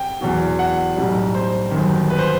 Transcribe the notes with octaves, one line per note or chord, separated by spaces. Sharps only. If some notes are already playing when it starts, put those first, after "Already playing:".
Already playing: G5
E2 B2 F#3
F#5
B1 A2 G3
C5
G1 F#2 D#3
B4
C5